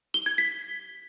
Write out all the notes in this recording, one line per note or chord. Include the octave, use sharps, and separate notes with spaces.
G7
G#6
B6